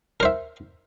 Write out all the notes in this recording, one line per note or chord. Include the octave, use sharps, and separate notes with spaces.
A#4 C5 E5